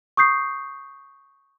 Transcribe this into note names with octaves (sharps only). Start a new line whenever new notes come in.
C#6 D#6 G6 C7